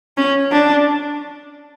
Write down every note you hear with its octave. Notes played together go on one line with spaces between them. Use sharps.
C#4
D4